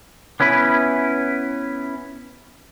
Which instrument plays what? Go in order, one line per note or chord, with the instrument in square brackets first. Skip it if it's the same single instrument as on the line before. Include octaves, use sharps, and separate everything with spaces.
[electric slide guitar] B3 C#4 E4 B4